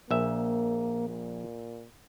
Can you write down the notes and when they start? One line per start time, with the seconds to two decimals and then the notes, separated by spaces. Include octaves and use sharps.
0.11 A#1 A#3 E5
1.08 A#2